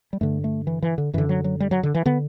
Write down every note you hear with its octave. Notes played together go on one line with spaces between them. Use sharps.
G3
G2 D3 A3
A3
E3
E3
D3
F#2 D3 E3
F#3
F#3
G3
F#3
D3
E3
D3 B3